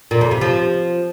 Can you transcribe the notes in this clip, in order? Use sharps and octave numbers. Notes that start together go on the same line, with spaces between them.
A#2
F2
C3
F3